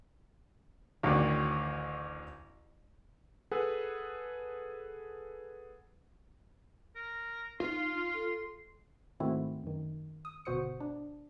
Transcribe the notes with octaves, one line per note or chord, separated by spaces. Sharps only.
A1 D2 D#3 F#4 D5 F#5
G#4 A4 B4 F#5
A#4
D#4 F4 C6
A4
G#2 D#3 A3 C4 E4 F#4
F#2 D#3
D#6
G1 B2 F#4 C5 D#6 C#7
D4